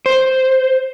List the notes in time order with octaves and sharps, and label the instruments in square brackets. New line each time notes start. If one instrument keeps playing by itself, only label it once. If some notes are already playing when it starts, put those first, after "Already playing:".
[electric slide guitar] C5